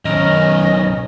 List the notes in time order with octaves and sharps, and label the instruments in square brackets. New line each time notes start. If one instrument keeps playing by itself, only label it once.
[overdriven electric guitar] B1 A#4 [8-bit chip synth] D#3 [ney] C#4 [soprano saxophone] D#5